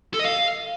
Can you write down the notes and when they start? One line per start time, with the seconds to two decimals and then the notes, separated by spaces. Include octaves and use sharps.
0.14 A4
0.19 D#5
0.25 F5